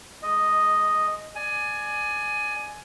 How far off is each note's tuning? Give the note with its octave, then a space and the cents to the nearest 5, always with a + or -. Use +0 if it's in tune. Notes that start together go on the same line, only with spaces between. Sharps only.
G#3 +15 D#5 +0
D5 +20 G#5 +15